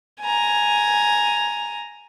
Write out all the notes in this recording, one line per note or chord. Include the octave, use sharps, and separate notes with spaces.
G#5 A#5